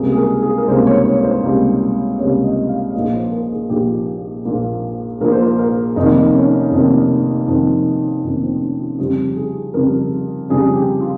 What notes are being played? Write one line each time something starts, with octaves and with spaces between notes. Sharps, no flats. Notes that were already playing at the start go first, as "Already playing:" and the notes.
Already playing: C#2 C3 G3 A#3 G#4
G#4
A#4
G#4
A#4
C#2 C3 G3 A#3 C5
C#5
C#5
C#5
C5
C#2 C3 G3 A#3
C#2 C3 G3 A#3 C#5
D#5
F5
A#1 A#2 F3 A#3 D#5
C5
A#4
G#4
A#1 A#2 F3 A#3 G4
A#1 A#2 F3 A#3
A#1 A#2 F3 A#3 A#4
C5
A#4
A#4
F1 F2 D#3 A#3 D#4
C#4
F1 F2 D#3 A#3
F1 F2 D#3 A#3
F1 F2 D#3 A#3 C#4
C4
C#4
F4
F2 C#3 G3 G4
G#4
F2 C#3 G3 A#4
F2 C#3 G3 G#4
G4
F4